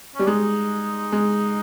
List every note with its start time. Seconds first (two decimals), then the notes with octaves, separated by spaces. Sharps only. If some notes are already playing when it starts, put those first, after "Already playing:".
0.15 G3 C#4
0.27 G#3 D#4
1.12 G#3